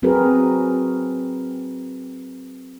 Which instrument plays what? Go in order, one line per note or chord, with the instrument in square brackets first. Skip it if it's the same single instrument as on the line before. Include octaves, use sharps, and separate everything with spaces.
[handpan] F#3 C4 F#4 G#4 A#4 B4